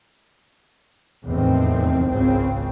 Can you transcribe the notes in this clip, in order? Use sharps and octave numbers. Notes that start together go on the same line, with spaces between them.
F1 E2 A2 D#3 C4
G#1 C#2 C#3 C4